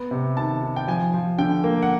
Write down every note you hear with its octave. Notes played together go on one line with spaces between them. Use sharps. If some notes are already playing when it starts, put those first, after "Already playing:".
Already playing: B3
C3
D#3 A5
D#3
G5
F3 G#5
F3
D3 G5
A#3
F#5